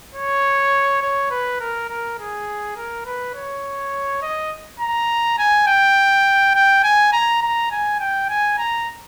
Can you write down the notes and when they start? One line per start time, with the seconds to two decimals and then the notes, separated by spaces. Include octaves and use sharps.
0.14 C#5
1.02 C#5
1.31 B4
1.60 A#4
1.89 A#4
2.18 G#4
2.77 A#4
3.05 B4
3.34 C#5
4.22 D#5
4.80 A#5
5.38 G#5
5.67 G5
6.54 G5
6.84 G#5
7.13 A#5
7.42 A#5
7.71 G#5
8.00 G5
8.29 G#5
8.58 A#5